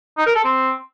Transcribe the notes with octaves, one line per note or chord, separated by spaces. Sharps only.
D#4
A#4
A4
C4